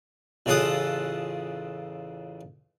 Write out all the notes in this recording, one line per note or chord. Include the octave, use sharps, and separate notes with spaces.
A1 C#3 F4 A4 F#5 D#6